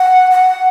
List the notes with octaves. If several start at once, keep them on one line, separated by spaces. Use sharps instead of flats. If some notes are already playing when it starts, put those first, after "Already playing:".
Already playing: F#5
F#5